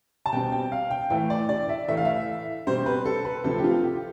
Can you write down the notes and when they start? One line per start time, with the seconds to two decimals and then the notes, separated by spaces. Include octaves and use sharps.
0.26 A5
0.32 B2 G3 C4 G5
0.52 G5
0.72 F5
0.91 G5
1.10 A2 E3 A3 G5
1.30 D5
1.49 D5
1.69 E5
1.88 A2 E3 A3 E5
1.97 F5
2.05 E5
2.67 B2 G3 C4 C5
2.86 B4
3.06 A4
3.25 B4
3.44 D2 C3 F3 C4 A4
3.58 G4
3.64 F4
3.84 G4